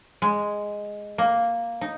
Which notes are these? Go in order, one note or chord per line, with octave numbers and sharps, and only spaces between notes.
G#3
A#3
D#4